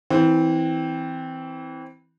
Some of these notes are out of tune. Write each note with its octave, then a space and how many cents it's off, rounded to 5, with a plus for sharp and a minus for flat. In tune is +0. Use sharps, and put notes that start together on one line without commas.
E3 -20 C4 -5